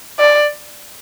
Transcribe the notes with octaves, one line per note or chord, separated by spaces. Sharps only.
D5